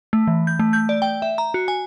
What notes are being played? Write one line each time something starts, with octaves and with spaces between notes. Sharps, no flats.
A3
E3
G6
A3
G6
D5
G5
E5
A#5
F#4
G#5